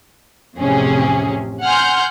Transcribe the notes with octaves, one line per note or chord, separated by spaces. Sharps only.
A1 F2 C3 C#4 G#4
F#5 G#5 C6 F6 G6